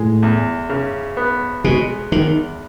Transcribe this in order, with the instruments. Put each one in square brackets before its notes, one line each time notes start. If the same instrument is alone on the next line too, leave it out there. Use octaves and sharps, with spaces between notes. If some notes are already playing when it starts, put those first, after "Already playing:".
Already playing: [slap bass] A2 [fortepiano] G#3
[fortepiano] E2
C#3
B3
[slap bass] B2 [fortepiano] G#3
[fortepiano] E2 [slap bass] D#3